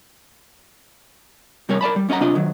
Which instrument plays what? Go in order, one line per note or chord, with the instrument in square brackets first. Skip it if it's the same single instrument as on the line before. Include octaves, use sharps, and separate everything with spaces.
[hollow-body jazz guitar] C3 G3 A#4 C#5
A#4 D5 A5 B5
G3
F#2 C#4 D#5 F#5 A#5
C3 D4 F4 D#5
D#3 F#3